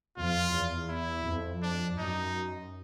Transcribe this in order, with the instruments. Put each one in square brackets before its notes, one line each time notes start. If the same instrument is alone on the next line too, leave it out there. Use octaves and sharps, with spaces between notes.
[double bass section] F2 [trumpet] F4
[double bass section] E2
[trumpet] E4
[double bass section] F2
[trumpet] D4
[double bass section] F#2 [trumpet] D#4